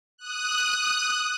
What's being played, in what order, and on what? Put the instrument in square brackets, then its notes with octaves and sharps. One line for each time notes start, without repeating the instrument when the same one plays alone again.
[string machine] D#6 F#6